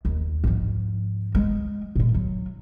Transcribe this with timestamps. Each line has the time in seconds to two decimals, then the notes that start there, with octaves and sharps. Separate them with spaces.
0.05 D#2
0.44 G#2 F3
1.35 G#3
1.95 A#2 G#3
2.14 F#3